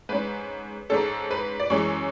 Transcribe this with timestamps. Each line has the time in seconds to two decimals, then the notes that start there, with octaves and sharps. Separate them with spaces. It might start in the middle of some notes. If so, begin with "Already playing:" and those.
0.09 G#2 G#3 C#4 B4
0.90 G#2 G#3 C#4 A4
1.31 B4
1.60 D5
1.70 F#2 E3 G#3 C#5